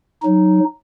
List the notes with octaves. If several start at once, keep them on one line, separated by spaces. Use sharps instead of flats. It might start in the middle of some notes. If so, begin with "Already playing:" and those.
F#3 D#4